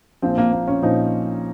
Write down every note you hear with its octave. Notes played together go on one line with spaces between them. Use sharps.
A#1 A#2 F3 C4
A#3
A#3
C#4
A#1 A#2 F3 D#4